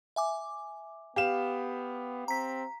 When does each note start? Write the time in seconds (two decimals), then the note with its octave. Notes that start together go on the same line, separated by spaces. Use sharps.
0.16 E5 G#5 D6
1.16 B3 G4 F5 E7
2.28 C4 A#5 B6